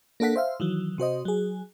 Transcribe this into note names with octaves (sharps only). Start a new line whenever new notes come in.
A#3 D4 A4 F#5 B6
C5 E5 F5
D#3 E3 F#3
C3 F#4 C5 D#5
F#3 G#4